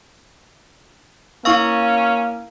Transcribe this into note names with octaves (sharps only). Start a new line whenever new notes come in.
A#3 C#4 E4 F5 C#6 E6